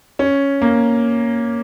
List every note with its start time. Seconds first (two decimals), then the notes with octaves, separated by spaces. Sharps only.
0.19 C#4
0.62 A#3